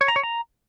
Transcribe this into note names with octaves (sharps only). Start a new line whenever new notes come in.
C#5
A#5
C#5
A#5